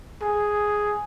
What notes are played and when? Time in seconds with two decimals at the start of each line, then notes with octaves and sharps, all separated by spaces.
0.22 G#4